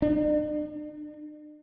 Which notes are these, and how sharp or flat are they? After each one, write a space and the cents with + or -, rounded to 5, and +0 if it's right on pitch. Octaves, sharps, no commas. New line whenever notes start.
D4 +45